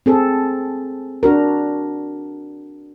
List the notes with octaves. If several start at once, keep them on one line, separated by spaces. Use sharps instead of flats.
C4 G#4 A4
D4 F#4 A#4